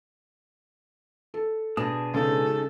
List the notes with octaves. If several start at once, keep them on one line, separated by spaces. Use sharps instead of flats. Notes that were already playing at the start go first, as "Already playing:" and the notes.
A4
B2 D4 G#4 A5 D#6
C#3 G#3 C#4 D#4 A4